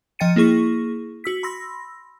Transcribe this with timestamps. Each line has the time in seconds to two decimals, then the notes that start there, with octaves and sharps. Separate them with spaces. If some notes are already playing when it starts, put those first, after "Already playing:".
0.19 F3 D#5 G5 A6 C#7 D#7
0.36 A#3 E4 G#4 C#6 A#6
1.24 F#4 E6 B6
1.43 B5 C6 E6 A#6